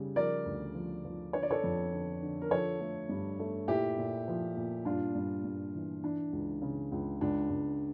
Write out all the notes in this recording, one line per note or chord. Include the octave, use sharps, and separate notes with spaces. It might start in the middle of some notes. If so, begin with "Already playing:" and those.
Already playing: C#3 G3
F3 A#4 D5
D2
F3
F3
D3 C#5
D5
A4 C#5
F2
D3
D3
A#4
F3 A4 C#5
A3
G2
A3
A#2 E4 G4
A#2
F3
A#2
G2 D4 F4
G2
G2
E3
E3 D4
C#2
C#3
C#2
C#2 D4
C#2